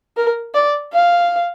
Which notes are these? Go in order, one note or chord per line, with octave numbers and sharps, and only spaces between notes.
A#4
D5
F5